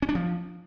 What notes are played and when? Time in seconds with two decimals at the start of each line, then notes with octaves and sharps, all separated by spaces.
0.02 C#4
0.09 D4
0.15 F3